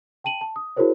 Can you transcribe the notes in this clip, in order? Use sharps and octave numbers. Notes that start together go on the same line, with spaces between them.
G5 A5 D#7 F#7
A5
D#6
E4 F#4 G#4 A#4 C5 C#5